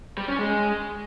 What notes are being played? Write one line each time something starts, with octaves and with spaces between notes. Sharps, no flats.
G3
C#4
G#3